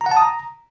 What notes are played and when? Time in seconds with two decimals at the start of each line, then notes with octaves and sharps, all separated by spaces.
0.01 A#5
0.06 F#5
0.11 A5
0.17 D#6
0.22 A#5